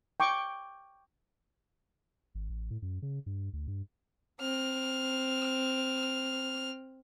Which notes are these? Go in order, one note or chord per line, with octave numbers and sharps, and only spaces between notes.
G5 C#6 D6
G#1
A1
A2
F#2
C#3
G2
D2
G2
C4 F6